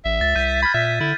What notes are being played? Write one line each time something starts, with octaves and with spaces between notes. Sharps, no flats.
A1 E5
C#2 A6
C2 G6 B6 D#7
B5 F6 G#6
A#2 E5
D3 E4